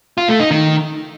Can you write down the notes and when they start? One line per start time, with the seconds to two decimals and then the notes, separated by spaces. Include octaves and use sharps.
0.18 F4
0.29 A3
0.40 D#4
0.51 D#3